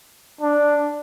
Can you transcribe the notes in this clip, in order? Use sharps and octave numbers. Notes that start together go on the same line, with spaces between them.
D4